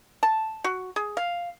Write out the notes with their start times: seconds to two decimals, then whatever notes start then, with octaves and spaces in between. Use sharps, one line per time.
0.23 A5
0.64 F#4
0.96 G#4
1.17 F5